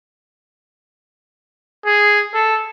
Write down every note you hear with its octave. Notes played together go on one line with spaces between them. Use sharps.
G#4
A4